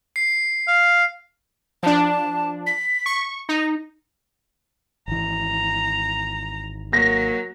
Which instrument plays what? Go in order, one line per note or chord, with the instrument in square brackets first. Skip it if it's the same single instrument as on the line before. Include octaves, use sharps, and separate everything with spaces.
[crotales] C7
[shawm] F5
[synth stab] F3 D4 [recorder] A5
[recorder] B6
[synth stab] C#6
[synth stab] D#4 [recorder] A#6
[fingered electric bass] G#1 E3 [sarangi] A#5
[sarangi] F#3 [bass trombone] A#3 [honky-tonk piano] A#6